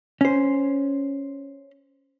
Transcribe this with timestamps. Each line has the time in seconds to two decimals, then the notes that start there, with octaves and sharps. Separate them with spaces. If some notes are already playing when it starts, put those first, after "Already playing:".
0.21 C#4 C5